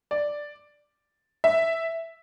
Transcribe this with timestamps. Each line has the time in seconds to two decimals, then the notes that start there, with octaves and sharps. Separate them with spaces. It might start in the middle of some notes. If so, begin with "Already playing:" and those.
0.11 D5
1.44 E5